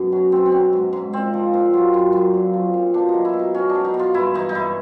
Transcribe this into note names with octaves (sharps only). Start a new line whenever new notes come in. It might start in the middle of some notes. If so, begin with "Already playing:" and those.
Already playing: F#2 B2
F#3 C#4
B2 C4
C4
F#3 C#4
G#2
G#2
A#2 C4
F3
A#2
F#3
F#2
F#2
A#2
F3
A#2
B2 D4
D#4
F#3
E4
B2
D#4
B2 C#4
D4
F#3
D#4
B2
F4
G2 E4
E3 D#4
D#4
G2 E4